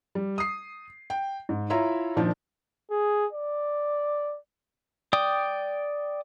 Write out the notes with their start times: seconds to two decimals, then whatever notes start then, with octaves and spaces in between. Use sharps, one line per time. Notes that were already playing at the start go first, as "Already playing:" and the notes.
0.15 G3
0.38 D#6 C7
1.10 G5
1.49 G#2
1.70 E4 F4 C#5 E5 A#5
2.16 A#2 D#3 F3 D4
2.91 G#4
3.33 D5
5.13 D5 G5 D#6